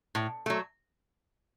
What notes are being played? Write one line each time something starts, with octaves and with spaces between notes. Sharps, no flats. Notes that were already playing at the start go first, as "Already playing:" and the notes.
A2
F#3 A3